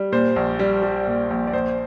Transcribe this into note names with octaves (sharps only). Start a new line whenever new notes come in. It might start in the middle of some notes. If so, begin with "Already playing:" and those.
Already playing: G3
A#2 C5
A#1
G3
G3
A#2
A#1
D5
A#1 C5